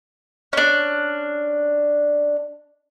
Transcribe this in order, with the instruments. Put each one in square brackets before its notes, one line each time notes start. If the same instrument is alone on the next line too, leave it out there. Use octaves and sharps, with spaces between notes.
[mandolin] C#4 D4